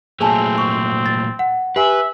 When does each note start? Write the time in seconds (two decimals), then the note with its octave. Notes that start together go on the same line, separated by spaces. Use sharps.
0.20 A#2 F#3 A3 C4 G#4 G#5 A5
0.58 C#6
1.06 A6
1.39 F#5
1.76 G4 B4 E5 G#5